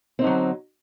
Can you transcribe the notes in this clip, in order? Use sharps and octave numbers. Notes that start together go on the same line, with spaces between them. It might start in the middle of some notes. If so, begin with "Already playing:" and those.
D3 F#3 C4 D#4